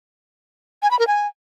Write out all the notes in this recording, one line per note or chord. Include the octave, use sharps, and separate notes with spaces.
G#5
B5
A#4
G#5